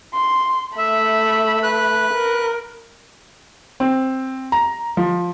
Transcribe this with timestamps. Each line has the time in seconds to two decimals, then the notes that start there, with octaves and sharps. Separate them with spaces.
0.15 C6
0.78 A3 E5 B5
1.63 B4 F#6
2.13 A#4
3.80 C4
4.52 A#5
4.97 F3